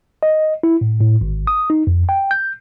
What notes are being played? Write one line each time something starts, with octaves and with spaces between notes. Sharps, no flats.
D#5
E4
A2
A2
G#1
D#6
D#4
F2
G5
G6